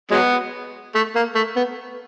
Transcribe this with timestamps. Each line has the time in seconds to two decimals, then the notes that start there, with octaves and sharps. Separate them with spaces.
0.11 F#3 G#3 B3
0.95 A3
1.15 A#3
1.35 A3
1.56 B3